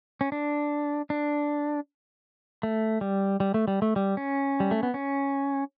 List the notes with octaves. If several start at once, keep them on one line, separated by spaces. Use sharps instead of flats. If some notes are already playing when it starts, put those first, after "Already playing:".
C#4
D4
D4
A3
G3
G3
A3
G3
A3
G3
C#4
G3
A3
B3
C#4